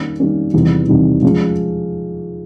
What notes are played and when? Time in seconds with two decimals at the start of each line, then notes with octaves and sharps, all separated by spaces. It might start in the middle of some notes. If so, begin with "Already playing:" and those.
Already playing: D#3 G3 A#3 C#4
0.19 D#3 G3 A#3 C#4
0.54 E2 C3 D#3 G3
0.88 E2 C3 D#3 G3
1.22 F3 G#3 C#4